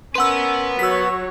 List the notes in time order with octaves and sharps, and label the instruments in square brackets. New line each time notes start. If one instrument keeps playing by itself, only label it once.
[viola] C#4 A#4 [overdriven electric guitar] B4 F#5 [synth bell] C6 E6
[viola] F#3 [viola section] F#4 C#5 [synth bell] E6 B6